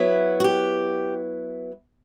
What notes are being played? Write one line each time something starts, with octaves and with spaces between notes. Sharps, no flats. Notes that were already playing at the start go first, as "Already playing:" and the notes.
Already playing: F#3 B3 E4
F#4
G4